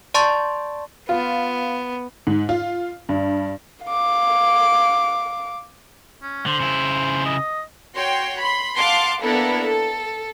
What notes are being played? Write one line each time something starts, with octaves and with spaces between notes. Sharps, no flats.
D5 A5 C6 C#6 A6
B3 F4
G#2
F4
G2
F5 D6
C#4
D3 C5
C#3 E4
D#5
F#4 C#5 G5 C6
B5 C6
F5 F#5 A5 C6 D6
A#3 B3 D4 E4 A4 A#4
A4